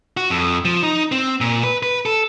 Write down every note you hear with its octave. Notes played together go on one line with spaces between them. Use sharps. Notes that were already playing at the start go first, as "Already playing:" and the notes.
F#4
F2
F3
D#4
C4
A#2
B4
B4
A4